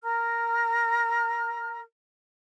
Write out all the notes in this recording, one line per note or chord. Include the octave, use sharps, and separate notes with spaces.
A#4 A#5 F6